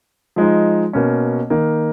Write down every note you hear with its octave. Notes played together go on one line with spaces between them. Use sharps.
F3 G#3 D#4
B2 A#3 C#4
D#3 A#3 D#4